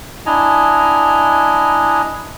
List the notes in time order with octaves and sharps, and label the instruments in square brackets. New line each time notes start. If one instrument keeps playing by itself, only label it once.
[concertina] D4 E4 D#5 G#5 A#5